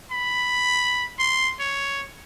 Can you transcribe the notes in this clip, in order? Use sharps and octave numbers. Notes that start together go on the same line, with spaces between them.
B5
C6
C#5